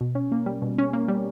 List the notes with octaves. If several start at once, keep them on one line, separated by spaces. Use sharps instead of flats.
B2
C#4
A#3
G3
B2
C#4
A#3
G3